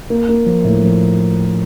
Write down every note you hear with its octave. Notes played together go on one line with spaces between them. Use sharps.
A#3
A#3
F3
A2
F3